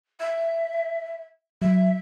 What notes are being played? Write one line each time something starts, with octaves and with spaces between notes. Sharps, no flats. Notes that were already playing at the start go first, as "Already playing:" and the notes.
E5
F#3 E5